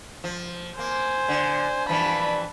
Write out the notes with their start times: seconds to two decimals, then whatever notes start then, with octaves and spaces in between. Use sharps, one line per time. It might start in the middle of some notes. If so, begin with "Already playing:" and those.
0.24 F3
0.79 A#3 C5 G#5
1.28 D3
1.89 G2 E3 F3 A5 B5